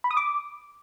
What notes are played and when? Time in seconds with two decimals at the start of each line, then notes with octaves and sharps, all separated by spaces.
0.04 B5
0.11 D#6
0.17 D6